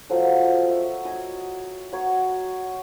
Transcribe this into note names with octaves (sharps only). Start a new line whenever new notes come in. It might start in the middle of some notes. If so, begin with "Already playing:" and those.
F3 F#3 A4
F#4 E5
C#5 D#5 G#5
F#3 C#5